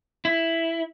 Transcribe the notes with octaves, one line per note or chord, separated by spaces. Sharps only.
E4